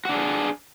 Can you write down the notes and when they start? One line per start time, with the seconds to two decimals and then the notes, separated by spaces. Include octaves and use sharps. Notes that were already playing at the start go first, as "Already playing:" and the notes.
0.05 F#4
0.09 D4
0.14 G#4